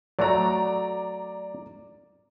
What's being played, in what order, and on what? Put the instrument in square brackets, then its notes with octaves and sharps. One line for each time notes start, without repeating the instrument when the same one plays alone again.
[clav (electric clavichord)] F#3 A3 F#4 [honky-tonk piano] D5 A#5